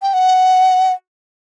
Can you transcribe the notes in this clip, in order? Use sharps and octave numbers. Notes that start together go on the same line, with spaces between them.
G5
F#5